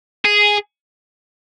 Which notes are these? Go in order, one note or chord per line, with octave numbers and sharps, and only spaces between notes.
G#4